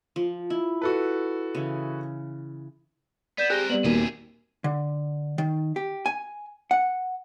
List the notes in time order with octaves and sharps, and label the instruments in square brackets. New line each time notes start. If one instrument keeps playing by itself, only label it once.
[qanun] F3
E4
[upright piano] F#4 A4 B4
[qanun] C#3 E3
[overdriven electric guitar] B3 [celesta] D5 G6 E7
[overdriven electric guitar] C4 A#4 [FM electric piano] G4 G#4 [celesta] F#6 A#6 G7
[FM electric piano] G3 B3 [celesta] D5 F#7
[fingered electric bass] D#1 D#2 A#3 [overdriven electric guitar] C3 G#4 [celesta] F#4
[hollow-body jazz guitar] D3
D#3
G4
G#5
F#5